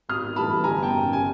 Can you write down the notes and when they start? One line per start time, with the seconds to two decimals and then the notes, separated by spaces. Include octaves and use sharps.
0.09 G#1 D#6 F6
0.36 G2 E3 A3 A5 B5
0.64 G1 G#5 A#5
0.83 G5 A5
0.91 F#2 C#3
1.13 G#5